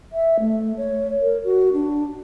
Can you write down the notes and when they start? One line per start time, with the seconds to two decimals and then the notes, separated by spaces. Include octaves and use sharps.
0.13 E5
0.40 A3
0.77 C#5
1.21 A#4
1.44 F#4
1.73 D4